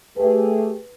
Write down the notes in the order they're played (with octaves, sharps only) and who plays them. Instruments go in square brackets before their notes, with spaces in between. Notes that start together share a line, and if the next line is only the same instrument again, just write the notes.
[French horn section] A3 G4 G#4 [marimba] B4